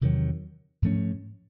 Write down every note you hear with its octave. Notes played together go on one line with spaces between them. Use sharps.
E2 C3 D#3 F#3
G#2 F3 A3 C#4